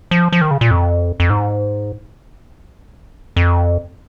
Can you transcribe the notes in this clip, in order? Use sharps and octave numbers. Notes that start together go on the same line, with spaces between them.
F3
F3
D#3
C#3
A#2
F2
F2
G#2
F2